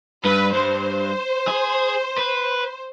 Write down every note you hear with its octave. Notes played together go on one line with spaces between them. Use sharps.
G2 B4
G2 C5
G#4
B4